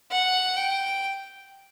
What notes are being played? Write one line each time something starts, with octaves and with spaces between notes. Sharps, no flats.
F#5
G5